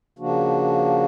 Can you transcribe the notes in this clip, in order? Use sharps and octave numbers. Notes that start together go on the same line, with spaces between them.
C#3 F3 A#3 D4 F#4